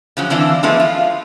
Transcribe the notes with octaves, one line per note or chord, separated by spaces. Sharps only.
C#3 F3 F#3
D3 E3 C4 D4 E4 F4
F3 G#3 A3 B3 E4 F4
F4